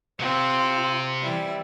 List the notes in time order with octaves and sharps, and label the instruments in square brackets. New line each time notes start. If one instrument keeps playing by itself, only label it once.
[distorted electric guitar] C3 [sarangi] C4 [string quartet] F4
[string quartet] E3 G3 E4